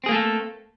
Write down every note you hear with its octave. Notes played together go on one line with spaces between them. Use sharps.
A3 A#3 C4 G#4 A4